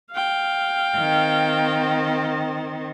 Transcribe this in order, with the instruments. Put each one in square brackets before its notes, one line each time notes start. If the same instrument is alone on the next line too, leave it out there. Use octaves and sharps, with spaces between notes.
[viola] F5 G5
[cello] D#3 C4